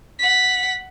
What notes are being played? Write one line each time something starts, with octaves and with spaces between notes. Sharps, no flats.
F#5 B6